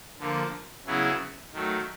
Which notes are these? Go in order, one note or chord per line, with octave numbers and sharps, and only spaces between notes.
D3 F3 A#3
C#3 F#3 B3 E4 G#4
D#3 F#3 A3